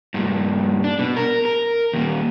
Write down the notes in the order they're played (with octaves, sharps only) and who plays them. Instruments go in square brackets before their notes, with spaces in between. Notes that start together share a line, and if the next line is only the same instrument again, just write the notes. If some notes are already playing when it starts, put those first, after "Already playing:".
[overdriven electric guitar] G2 A#2
D4
B2
A#4
A#4
D#2 A#2